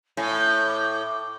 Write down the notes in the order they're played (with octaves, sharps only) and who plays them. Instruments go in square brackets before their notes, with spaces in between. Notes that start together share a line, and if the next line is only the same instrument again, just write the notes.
[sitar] A2 [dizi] G#5
[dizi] G6
D6